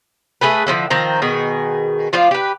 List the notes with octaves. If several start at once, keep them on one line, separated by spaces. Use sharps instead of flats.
A3 G#4 A4 B4
D3 F3 C#4 E4
D#3 F3 C4 A#5
B2 D#3 G#4
F3 F4 C5 D5
G4 B4